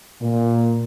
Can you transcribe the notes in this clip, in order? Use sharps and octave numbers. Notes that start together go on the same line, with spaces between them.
A#2